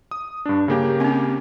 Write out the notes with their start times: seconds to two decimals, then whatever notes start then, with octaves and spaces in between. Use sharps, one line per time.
0.11 D#6
0.46 G2 D4
0.68 C#3 A#3 G4
1.00 C4 C#4